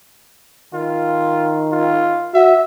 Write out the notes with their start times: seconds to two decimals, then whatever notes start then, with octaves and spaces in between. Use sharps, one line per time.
0.74 D#3 F4
1.71 F4
2.34 F#4 E5